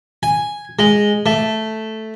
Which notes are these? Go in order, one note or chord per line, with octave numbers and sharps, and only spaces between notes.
G#5
G#3
A3